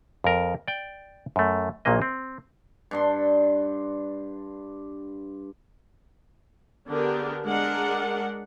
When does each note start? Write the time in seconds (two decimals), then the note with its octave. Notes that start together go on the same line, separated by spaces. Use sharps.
0.24 F2 A#4
0.68 D5 G5
1.36 F#2 A3
1.85 A#1 A#2 F#3 A#3 D#5
2.02 C4
2.91 G2 D4 C6
6.89 D3 B3 D4 G4 G#4 A#4
7.45 G#3 D4 A#4 F#5